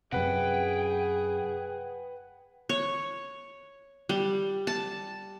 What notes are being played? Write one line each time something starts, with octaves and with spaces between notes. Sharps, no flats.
F#2 C3 G#4 B4 F#5 G5
C#5
G3
A5